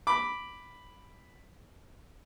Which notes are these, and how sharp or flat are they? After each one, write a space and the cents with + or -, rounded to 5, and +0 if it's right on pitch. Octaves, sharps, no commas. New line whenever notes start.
B5 +0 D6 +0